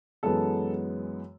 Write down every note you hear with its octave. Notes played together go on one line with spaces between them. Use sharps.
F#2 E3 G#3 B3 A4